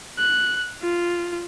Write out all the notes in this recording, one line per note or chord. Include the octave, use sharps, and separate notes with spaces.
F#6
F4